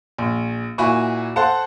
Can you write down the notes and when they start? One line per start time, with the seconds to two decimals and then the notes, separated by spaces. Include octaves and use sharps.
0.18 A#1
0.78 A#2 E4 F#4 G#5 B5 C#6
1.36 A4 C5 F#5 A5